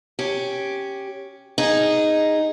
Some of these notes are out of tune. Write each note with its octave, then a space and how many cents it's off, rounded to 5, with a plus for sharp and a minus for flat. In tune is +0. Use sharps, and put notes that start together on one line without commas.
C#4 +0 G4 +0
D#4 +0 G#4 -10